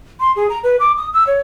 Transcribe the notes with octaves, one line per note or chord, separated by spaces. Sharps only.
C6
G#4
A#5
B4
D6
D#6
E6
C#5